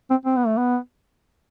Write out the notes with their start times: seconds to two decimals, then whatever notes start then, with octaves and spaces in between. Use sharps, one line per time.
0.10 C4
0.25 C4
0.36 B3
0.47 A3
0.58 B3